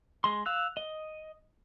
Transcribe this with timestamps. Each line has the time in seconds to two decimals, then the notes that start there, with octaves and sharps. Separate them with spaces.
0.24 G#3 C6
0.46 F5 E6 F#6
0.77 D#5